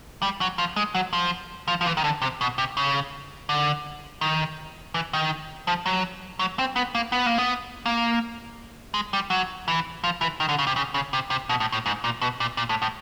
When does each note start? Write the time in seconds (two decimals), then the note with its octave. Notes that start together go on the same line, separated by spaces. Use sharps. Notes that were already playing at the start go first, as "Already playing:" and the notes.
0.22 G3
0.41 F#3
0.58 F3
0.76 G#3
0.95 F#3
1.13 F3
1.68 F3
1.81 F3
1.86 E3
1.97 D#3
2.04 D3
2.22 C3
2.41 B2
2.58 C3
2.77 C#3
3.49 D3
4.21 D#3
4.94 E3
5.13 D#3
5.67 F3
5.86 F#3
6.39 F#3
6.59 C4
6.76 B3
6.95 A#3
7.12 B3
7.26 A#3
7.38 B3
7.86 A#3
8.94 G#3
9.13 G3
9.30 F#3
9.68 E3
10.04 F3
10.21 E3
10.40 D#3
10.49 D3
10.59 C#3
10.67 C3
10.76 C#3
10.94 C#3
11.13 C3
11.30 C3
11.49 B2
11.60 A2
11.72 A2
11.86 G#2
12.04 A#2
12.22 B2
12.40 A#2
12.57 A#2
12.69 A2
12.82 A2